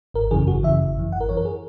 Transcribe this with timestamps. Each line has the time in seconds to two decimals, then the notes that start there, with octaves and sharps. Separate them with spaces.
0.14 G#1 A#4
0.31 F#2 C#3 E3 G#4
0.47 G#1 F#4
0.63 F#2 C#3 E3 E5
0.80 G#1
0.96 F#2 E3
1.12 G#1 F#5
1.21 A#4
1.29 F#2 E3 C#5
1.37 A#4
1.45 G#4